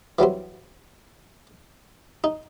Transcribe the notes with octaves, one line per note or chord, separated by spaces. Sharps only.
E3 F#3 G3 C4
D#4